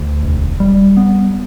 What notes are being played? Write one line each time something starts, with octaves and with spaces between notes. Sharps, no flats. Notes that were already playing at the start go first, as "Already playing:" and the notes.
Already playing: D2
E1
G3
B3